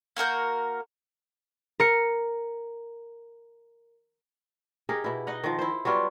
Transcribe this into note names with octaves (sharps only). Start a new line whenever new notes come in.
A#3 F#4 A#4 G6
A#4 C#7
D#4 G4 G#4 A#4
B2 E4
D#4 D#5 F#5
D#3 F3
E4 C5
F#3 G3 B3 F4